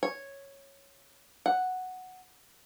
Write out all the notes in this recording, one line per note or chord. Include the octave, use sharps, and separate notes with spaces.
C#5
F#5